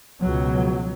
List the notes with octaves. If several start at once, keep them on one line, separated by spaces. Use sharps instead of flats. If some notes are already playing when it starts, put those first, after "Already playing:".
C#2 B2 F#3